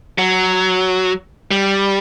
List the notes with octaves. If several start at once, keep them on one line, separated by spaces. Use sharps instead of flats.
F#3
G3